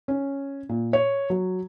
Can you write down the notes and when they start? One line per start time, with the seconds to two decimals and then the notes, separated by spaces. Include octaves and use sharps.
0.08 C#4
0.69 A#2
0.93 C#5
1.30 F#3